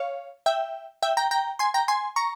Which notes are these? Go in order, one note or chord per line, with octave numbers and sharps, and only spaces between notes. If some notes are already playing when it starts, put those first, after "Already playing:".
Already playing: C#5 F5
E5 G5
E5 G5
G5 A#5
G5 A#5
G#5 C6
G5 A#5
G#5 C6
A#5 C#6